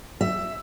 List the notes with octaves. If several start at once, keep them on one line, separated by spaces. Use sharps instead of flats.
E5